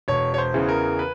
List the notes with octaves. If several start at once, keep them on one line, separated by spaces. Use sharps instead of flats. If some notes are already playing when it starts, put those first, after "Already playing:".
E1 C#5
C#5
C5
E2 C#3 E3
A#4
B4